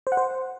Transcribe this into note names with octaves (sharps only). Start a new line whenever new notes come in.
C5
F#5
C5